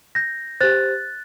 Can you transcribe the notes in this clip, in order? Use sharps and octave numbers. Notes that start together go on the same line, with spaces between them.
G6 A#6
G4 C5 F#6 A6